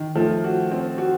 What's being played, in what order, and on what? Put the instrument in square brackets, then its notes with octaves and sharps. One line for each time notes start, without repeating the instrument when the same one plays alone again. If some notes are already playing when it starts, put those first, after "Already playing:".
Already playing: [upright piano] D#3
[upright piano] F3 [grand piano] A3
[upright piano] F#4
C4
F#4